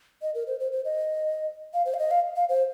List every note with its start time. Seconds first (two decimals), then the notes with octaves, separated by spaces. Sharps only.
0.22 D#5
0.35 A#4
0.47 C5
0.60 C5
0.72 C5
0.85 D#5
1.74 F5
1.85 C5
1.94 F5
1.99 D#5
2.11 F5
2.36 F5
2.49 C5